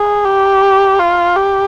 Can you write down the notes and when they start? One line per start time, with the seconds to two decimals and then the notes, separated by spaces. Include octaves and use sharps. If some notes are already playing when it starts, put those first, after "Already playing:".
Already playing: G#4
0.25 G4
0.99 F4
1.36 G4